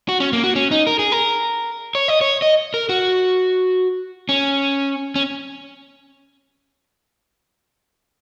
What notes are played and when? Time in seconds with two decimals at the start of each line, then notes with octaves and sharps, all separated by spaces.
0.09 F#4
0.20 C#4
0.33 A#3
0.44 F#4
0.56 C#4
0.71 D#4
0.87 A#4
0.99 G#4
1.12 A#4
1.95 C#5
2.08 D#5
2.21 C#5
2.42 D#5
2.74 A#4
2.89 F#4
4.29 C#4
5.15 C#4